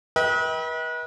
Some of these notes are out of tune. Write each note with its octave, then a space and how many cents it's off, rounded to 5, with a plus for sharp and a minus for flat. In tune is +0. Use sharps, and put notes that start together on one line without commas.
B4 -35 D#5 +45 G5 +0